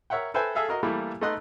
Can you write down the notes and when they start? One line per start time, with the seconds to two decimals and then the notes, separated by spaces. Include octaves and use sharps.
0.10 A#4 C#5 E5 F#5 G5
0.34 A4 B4 C5 E5 G5 G#5
0.55 G#4 A4 E5 F5
0.69 F#4 A#4 D#5
0.83 E3 G3 A3 A#3 E4
1.21 A3 B3 D#4 D#5 C6 F#6